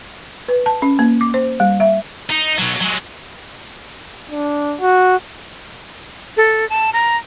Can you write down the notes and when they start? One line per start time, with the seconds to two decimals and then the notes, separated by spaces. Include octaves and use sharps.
0.48 B4
0.66 A5
0.82 C#4
0.99 A#3
1.21 D6
1.34 C5
1.60 G3
1.80 E5
2.30 D#4
2.59 B2 F#3
2.81 F#3 G#3
4.31 D4
4.80 F#4
6.37 A4
6.69 A5
6.93 A#5